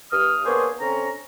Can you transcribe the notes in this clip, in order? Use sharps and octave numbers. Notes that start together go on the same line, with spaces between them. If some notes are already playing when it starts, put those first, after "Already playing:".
G2 D#6 F6
A#3 B3 D4 G#4 C5 C#5
D3 C4 C#4 A#5